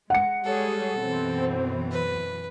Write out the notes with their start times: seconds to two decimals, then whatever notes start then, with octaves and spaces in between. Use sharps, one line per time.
0.10 G#3 F#5 C#7
0.45 G3 G#3 G#4 A4 C#5
0.98 F#2 B2 E3 C4
1.91 B4